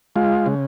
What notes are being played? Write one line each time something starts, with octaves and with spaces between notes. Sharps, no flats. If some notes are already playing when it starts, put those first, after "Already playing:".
G#3 F4
C#3